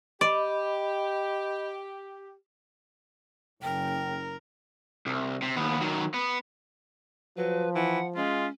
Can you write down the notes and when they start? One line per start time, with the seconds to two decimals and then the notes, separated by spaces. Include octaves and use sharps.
0.21 G4 D5 D#5 B5
3.62 F#1 A#4 G5
5.06 C2
5.42 C3
5.57 D#2 B3
5.81 D#3 F#3
6.14 B3
7.37 F3 F#3 B4
7.75 E3 F#5 B5
8.16 G#3 C#4 F4